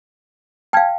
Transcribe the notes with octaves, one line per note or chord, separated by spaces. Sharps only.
F5 G5 A5 F6 G#6